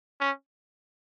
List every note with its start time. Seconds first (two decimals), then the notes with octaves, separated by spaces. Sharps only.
0.20 C#4